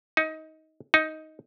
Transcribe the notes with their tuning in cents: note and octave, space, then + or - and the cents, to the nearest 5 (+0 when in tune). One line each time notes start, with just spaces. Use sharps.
D#4 +20
D#4 +10